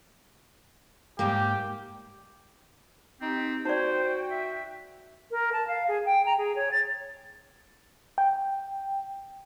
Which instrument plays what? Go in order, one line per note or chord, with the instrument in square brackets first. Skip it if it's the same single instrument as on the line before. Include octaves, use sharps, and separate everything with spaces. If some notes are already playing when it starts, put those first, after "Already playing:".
[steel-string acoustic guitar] G#2 G3 A#3 [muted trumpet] G4
[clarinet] C4 [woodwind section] D#4 G4
[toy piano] D#4 D5 [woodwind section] F#4 G5 [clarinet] C5
[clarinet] E5
[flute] A#4
A5
F5
G#4
G5
A#5
G#4
C#5
A6
[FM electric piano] G5